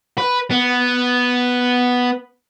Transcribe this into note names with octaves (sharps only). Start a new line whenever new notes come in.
B4
B3